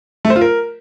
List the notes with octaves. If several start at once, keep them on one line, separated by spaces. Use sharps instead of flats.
A3
C5
F4
A#4